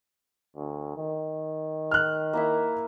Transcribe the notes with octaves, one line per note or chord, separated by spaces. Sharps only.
D2
D#3
F6 F#6
A#3 E4 E5